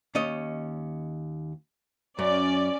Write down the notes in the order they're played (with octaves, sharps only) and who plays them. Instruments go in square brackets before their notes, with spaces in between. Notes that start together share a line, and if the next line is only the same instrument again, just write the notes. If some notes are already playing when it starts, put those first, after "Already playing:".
[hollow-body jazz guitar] D#2 C#4 D#5
[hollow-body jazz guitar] F#2 [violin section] C#4 D5